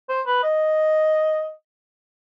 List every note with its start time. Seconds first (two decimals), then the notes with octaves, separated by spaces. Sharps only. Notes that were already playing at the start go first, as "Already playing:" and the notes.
0.09 C5
0.26 B4
0.43 D#5